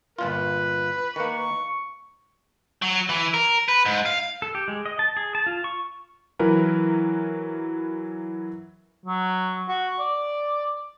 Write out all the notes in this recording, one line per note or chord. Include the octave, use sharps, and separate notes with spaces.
G1 A#2 F4 B4
D#3 A#3 C#6
F#3
E3
A#4
B4
G#2
F5
A4
G4
G#3
D#5
A5
G#4
A5
F4
C#6
E3 F#3 E4 F#4 A#4 B4
F#3
F#4
D5